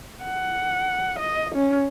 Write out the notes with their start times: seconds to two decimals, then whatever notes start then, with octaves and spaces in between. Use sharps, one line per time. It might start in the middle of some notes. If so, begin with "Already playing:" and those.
0.24 F#5
1.19 D#5
1.55 C#4